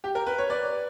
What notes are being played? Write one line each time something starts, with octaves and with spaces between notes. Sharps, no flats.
G4
A#4
B4
C#5
B4 D5